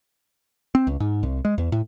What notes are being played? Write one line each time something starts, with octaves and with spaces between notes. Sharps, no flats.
C4
C#2
G#2
C2
G#3
E2
A2